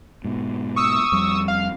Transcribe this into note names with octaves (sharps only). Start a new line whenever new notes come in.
G#2 B2
C#6 D#6 E6
F2 G3 C4
F5